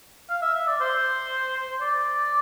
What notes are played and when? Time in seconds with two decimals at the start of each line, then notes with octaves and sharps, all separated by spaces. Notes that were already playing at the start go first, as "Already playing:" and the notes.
0.29 F5
0.42 E5
0.55 E5
0.67 D5
0.80 C5
1.81 D5